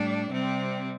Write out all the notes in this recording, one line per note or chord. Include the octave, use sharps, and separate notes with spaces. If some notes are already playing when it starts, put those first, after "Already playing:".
Already playing: A2 G3 D4
C3 G3 C4